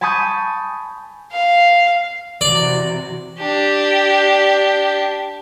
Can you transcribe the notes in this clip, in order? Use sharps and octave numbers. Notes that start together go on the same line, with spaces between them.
G#5 A5 B5 C#6 D#6 G6
F5
C3 E3 F#4 D5
D4 G4